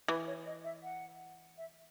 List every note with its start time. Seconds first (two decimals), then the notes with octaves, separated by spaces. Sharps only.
0.08 E3 B4
0.27 C#5
0.46 D#5
0.64 E5
0.83 F#5
1.57 E5